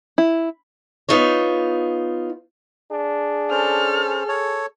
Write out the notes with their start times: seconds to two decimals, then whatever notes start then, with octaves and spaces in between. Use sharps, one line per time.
0.18 E4
1.09 B3 D#4 F4 C#5
2.91 D4 G#4
3.51 C#4 A4 C5 F6
4.29 A4 C#5